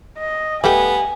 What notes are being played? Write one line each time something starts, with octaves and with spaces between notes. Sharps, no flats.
D#5
D1 G3 A3 B3 G4 G#5